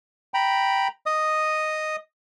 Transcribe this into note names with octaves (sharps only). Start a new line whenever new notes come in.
G5 A#5 B5
D#5 D#6